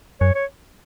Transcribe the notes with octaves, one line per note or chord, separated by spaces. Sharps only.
F#2 C#5
C#5